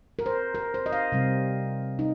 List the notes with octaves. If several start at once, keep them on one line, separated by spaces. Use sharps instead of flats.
A#4
C5
A#4
C5
D#5
F5
C3 G3 C4
D#4